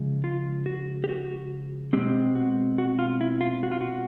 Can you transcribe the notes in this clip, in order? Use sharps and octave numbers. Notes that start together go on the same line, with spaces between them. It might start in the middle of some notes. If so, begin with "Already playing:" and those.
Already playing: C#3 F3 G#3
F4
F#4
G4
F#4
B2 G#3 C4 G4
F#4
F#4
F4
E4
F4
F#4
F4
F#4